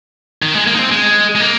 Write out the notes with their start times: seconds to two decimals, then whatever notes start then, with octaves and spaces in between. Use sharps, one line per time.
0.42 D#3
0.54 G#3
0.67 A#3
0.75 D#4
0.79 C4
0.91 G#3
1.35 G#3
1.40 A#3